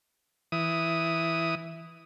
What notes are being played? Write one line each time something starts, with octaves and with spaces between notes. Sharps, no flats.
E3 D#6